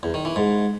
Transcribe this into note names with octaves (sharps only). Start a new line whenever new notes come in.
E2
D#3
E3
G#2